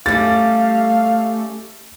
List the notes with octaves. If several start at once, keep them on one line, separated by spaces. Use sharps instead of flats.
G3 A3 C#4 F5 A6